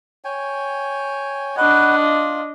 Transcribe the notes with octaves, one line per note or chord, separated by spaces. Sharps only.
C#5 G5 G#5
D4 F#4 B4 D#5 F#5
F4